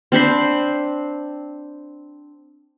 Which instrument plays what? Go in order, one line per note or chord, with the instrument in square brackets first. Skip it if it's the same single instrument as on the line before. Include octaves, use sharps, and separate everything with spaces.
[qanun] C4 D4 C5 B5